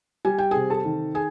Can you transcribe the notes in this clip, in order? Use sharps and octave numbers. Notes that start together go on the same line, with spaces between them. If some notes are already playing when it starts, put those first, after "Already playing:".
G3 G#5
G5
C3 G#4 G#5
A4 A5
D#3
G#4 G#5